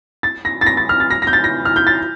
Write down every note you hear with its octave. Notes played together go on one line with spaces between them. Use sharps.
A6
A#6
A6
A#6
A6
F6
A6
A#6
A#6
G6
A6
A#6
F6
G6
A6